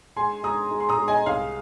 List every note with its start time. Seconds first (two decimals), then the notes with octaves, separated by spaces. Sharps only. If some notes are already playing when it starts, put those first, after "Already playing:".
0.17 G#3 G#5 C6
0.43 G#3 A#5 D#6
0.71 G#3
0.80 C6
0.89 A#5 D#6
0.98 G#3
1.08 D#5 G#5
1.26 C2 F5